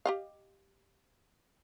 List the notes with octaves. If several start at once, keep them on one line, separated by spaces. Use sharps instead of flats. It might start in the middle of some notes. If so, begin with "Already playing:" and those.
G4 D#5 F5